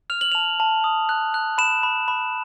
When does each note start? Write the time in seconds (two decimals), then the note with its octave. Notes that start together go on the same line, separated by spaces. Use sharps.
0.10 F6 F7
0.21 F#7
0.32 A5 F7
0.60 A5
0.84 D#6
1.09 F#6
1.34 F#6
1.58 B5 E7
1.83 B5
2.08 B5